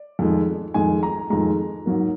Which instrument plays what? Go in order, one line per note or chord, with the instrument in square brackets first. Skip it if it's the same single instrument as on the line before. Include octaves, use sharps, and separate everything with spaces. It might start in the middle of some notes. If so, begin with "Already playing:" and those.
Already playing: [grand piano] D5
F2 D#3 G#3
F2 D#3 G#3 G#5
A#5
F2 D#3 G#3 A#5
G#2 F#3 A#3